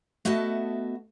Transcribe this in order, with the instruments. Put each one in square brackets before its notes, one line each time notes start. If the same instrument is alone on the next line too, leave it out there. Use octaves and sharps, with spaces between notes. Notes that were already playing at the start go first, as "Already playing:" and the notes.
[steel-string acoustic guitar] A3 B3 F#4 D#5 E5 A5